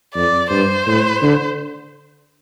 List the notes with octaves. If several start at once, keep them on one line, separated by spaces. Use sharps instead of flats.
F2 D5
G2 C5
A2
D3